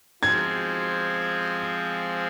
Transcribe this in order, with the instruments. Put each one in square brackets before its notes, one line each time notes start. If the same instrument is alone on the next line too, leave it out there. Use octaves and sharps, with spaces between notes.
[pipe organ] F3 G#3 C4 G#4 [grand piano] G#6